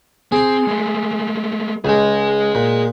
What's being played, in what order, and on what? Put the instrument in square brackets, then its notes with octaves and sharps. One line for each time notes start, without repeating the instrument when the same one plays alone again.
[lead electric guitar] C4 [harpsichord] G#4 C6
[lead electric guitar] G#3 A3
[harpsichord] C#2 G#3 [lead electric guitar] G#4 D#5
[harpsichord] A#2